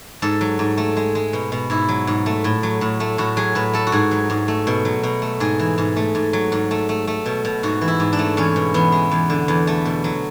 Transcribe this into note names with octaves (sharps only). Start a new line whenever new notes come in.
G#2 A4
F#3
G#2
A3
G#3
G#3
B2
B2
G#2 E4
F#3
G#2
A3
A2
F#3
A2
A3
A2 F#4
F#3 G#4
A2 B4
A3 A4
F#4
G#2 G#4
F#3
G#2
A3
B2
F#3
B2
A3
G#2 G#4
E3
G#2
A3
G#2
F#3
G#2
A3
A3
A3
B2
B2
G#2 F#4
E3
E4
G#2
D4
A3
E2 C#4
B2
E2 B3
G#3
E2
D3
E2
A3
B2
F#3